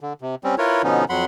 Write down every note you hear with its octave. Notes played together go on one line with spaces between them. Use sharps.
D3
C3
G3 C4 C#4
E4 F4 A#4 B4 C#5
B2 D3 F3 B3 C#4 D#4
F2 F#3 F#5 B5 C6